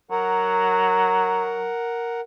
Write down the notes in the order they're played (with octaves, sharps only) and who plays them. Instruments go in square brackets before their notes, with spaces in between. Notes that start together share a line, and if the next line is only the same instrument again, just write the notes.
[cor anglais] F#3 [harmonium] A#4 F#5